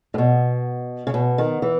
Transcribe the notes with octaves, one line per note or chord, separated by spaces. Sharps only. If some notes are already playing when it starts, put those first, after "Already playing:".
A2
B2
C#3
B2
D#3
E3